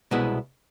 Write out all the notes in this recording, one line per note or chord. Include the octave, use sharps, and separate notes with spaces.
C2 B2 G#3 B3 E4